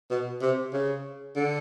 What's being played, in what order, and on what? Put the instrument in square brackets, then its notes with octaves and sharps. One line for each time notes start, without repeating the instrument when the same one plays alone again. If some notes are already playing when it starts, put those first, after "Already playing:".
[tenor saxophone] B2
C3
C#3
D3